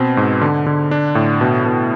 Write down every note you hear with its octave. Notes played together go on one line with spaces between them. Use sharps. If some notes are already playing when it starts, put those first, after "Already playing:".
Already playing: B2 C4
G#2
D3
D3
D4
A2
B2
B2